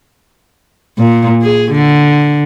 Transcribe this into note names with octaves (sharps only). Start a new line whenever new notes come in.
A#2
G#4
D3